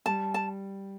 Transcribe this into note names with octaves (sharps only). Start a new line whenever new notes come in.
G3 A5
A5